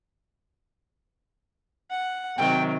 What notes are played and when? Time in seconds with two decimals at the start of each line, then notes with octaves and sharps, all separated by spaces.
1.90 F#5
2.38 C3 D#3 F#3 G5